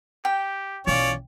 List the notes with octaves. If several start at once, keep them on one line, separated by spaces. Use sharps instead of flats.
G4 G5
B1 E3 C#4 F4 C#5 D5